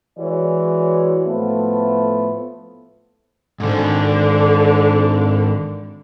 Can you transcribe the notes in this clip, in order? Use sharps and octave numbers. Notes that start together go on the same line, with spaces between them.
E3 G#3 F#4 G#4 C#5 D5
A2 F3 A3 B3
G#2 D3 D#3 D4